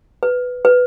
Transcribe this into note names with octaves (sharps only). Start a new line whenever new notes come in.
B4
B4